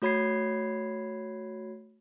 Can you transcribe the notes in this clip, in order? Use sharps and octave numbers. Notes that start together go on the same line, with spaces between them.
A3 F#4 C#5 B5 G#6 C7